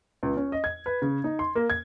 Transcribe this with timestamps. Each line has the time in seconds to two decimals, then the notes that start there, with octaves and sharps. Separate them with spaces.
0.23 C#2
0.37 C#4
0.52 D#5
0.64 G#6
0.86 B4
1.02 C#3
1.24 D#4
1.39 C6
1.55 A#3
1.70 G#6